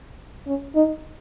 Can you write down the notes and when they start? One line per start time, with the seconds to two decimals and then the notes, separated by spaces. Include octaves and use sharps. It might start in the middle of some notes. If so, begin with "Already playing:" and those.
0.47 C#4
0.75 D#4